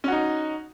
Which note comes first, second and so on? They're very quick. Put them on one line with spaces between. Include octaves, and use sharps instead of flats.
C#4 F#4 D#4